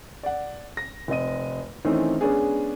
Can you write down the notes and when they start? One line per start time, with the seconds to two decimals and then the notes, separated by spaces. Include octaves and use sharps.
0.23 D5 F#5
0.77 A#6
1.08 F1 C4 D#5 D#7
1.85 D#3 E3 A3 C4 C#4 D#4
2.21 G#3 B3 C#4 D4 G#4